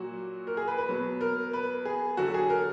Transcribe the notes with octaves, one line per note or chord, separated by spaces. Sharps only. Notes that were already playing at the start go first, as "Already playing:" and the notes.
Already playing: A#2 F#3 F#4
A#4
G#4
B4
B4
B2 F#3
A#4
B4
G#4
D3 F#3 F#4
G#4
A#4